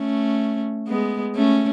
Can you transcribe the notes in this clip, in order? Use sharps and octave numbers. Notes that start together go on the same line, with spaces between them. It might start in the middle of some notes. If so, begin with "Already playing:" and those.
Already playing: A3 C#4
G#3 B3
A3 C#4